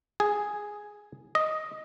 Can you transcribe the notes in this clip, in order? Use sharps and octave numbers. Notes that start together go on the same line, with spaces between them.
G#4
D#5